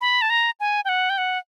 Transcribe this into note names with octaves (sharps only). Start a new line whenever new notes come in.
B5
A5
A#5
G#5
G5
F#5
G5
F#5